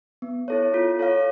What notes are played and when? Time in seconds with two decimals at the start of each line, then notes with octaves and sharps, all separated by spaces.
0.22 B3
0.48 E4 A4 C#5
0.74 F4
0.99 A4 C#5 F5